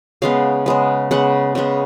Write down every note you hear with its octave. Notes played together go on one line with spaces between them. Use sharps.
C#3 G#3 B3 F5
C#3 G#3 B3
C#3 G#3 B3 F#5
C#3 G#3 B3